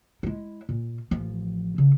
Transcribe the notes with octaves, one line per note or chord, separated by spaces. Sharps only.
G#3 E4
A#2
A1 F3
C#3